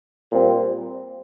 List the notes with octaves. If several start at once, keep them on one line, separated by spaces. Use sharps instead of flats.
A#2 G3 C4